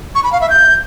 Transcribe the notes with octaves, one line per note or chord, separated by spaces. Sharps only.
C#6
B5
F5
E5
G6